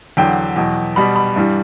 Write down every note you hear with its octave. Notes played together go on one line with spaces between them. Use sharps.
E2 D3 F#3 G5
E2 B2 F#3
B2 G3 B5
B5
G2 E3 G3